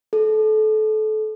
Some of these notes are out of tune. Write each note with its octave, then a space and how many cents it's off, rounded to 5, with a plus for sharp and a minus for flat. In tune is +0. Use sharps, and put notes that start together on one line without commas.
A4 -30